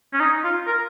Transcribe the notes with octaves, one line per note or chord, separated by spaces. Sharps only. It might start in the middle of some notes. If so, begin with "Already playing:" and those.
C#4
D#4
F4
A#4